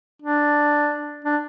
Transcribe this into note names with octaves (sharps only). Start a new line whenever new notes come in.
D4
D4